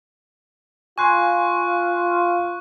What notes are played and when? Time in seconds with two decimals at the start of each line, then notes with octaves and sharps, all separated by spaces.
0.98 F4 G#5 C6 C#6 F#6